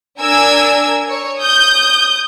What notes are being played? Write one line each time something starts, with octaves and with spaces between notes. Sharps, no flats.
D4 A#4 G#5 E6 G#6
C#5
D#6 G6